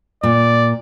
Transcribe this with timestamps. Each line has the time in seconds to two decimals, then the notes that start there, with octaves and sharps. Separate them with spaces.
0.23 A#2 D5